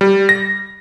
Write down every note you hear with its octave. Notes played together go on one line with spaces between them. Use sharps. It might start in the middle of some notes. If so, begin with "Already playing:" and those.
G3
A#6